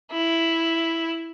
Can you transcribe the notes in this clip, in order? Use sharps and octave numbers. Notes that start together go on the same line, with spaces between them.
E4